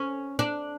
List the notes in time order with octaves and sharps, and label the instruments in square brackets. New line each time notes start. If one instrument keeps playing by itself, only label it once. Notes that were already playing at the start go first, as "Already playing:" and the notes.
Already playing: [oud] C#4
D4